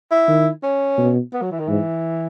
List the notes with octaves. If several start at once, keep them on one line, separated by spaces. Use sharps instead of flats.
E4
D#3
C#4
B2
B3
F#3
E3
D#3
G#2 E3